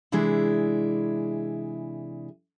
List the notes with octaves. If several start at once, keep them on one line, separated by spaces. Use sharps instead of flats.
C3 E3 G#3 D4 E4 G#4